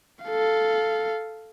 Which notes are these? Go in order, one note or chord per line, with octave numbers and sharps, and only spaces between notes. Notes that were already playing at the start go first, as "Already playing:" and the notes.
A4 F5